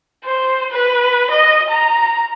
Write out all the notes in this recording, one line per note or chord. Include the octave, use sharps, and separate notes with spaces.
C5
B4
D#5
A#5